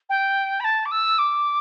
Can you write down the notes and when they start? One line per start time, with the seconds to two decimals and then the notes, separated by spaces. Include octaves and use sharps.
0.09 G5
0.60 B5
0.64 A5
0.85 D6
0.91 E6
1.18 D6